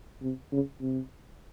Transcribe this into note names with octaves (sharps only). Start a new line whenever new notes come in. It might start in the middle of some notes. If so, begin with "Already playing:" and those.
C3
C#3
C3